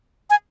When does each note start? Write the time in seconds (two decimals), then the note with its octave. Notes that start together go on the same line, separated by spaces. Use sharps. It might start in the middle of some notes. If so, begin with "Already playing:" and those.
0.30 G#5